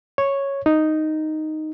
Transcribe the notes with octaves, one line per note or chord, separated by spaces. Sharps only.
C#5
D#4